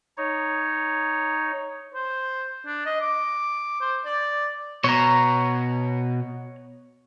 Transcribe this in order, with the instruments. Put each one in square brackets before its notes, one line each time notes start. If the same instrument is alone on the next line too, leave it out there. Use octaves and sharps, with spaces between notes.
[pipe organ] D#4 C#5
[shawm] C5
D4
D#5
D6
C5
D5
[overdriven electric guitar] B2 [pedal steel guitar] C#5 A#5